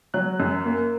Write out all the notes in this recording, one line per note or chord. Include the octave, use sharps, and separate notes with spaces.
F#3 F#6
F#2
A#3